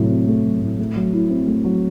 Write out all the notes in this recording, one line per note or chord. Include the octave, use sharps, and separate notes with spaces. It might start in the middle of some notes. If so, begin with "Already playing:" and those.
Already playing: A2 C3 F#3
C4
A3
F#3
A2
A3
F#3
E4
C4
A3
F#3